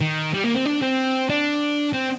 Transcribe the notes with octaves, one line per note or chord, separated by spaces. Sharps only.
D#3
G3
A#3
C4
D4
C4
D4
C4